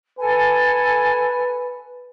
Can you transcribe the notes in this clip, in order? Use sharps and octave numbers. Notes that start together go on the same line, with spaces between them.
A4 B4 G#5